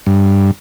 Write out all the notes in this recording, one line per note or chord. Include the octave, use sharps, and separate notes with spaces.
G2